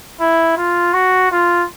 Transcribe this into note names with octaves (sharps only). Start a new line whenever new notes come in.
E4
F4
F#4
F4